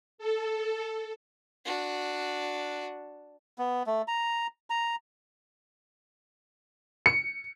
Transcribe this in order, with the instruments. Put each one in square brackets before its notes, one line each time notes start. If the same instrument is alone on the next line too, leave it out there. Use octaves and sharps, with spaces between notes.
[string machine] A4
[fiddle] D4 F#4
[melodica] B3
A3
A#5
A#5
[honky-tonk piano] C#7